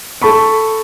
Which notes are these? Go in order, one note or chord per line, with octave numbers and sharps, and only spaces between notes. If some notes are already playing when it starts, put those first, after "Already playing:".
A4 A5 B5 C#6